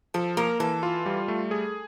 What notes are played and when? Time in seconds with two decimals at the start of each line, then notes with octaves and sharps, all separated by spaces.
0.14 F3 A4
0.37 A#3 A#4
0.60 E3 A4
0.83 F4
1.06 G3
1.28 A3
1.51 G#4